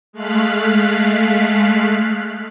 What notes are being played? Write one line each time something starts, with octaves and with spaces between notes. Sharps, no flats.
G#3 A3 F5 F#6 B6